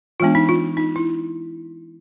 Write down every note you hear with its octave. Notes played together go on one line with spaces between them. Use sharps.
E3 G#3 B3 D4 F4
D#4
F4
D#4
E4